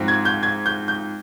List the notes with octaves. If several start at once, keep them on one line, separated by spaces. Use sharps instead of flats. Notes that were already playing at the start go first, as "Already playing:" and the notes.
Already playing: G#2 F3 C4
G#6
G6
G#6
G6
G6